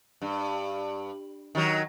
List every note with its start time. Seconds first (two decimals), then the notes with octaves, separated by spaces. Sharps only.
0.22 G2
1.55 D#3 F#3